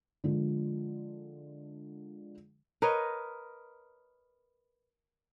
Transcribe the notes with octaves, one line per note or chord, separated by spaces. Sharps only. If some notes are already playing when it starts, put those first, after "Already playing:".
D3 F3 G#3
A#4 B4 C#5 D#5